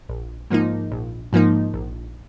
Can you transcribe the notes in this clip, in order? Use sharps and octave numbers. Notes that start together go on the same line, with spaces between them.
A#1
G#2 F3 A#3 D#4
A#1
G#2 F3 A#3 D#4
A#1